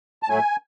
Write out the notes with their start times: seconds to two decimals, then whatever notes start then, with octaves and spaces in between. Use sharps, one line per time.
0.23 A5
0.29 A2 F#3 A3 G#5